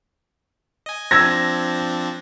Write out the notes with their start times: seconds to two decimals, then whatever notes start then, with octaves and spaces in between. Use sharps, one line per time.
0.86 D#5 G#5
1.11 F3 C4 D4 E6 G#6 A#6